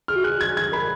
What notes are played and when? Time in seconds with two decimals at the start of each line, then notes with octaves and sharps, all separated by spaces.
0.08 G#4 F6
0.16 F#4
0.24 G#4 F#6
0.41 G#6
0.57 G#6
0.72 A#4 B5